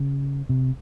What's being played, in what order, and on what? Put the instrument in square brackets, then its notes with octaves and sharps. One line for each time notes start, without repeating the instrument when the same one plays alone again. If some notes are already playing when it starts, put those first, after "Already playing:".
Already playing: [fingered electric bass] C#3
C3